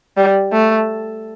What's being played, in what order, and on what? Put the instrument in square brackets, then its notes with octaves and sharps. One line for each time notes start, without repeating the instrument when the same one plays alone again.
[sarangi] G3
A3